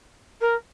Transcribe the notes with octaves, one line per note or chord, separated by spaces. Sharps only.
A#4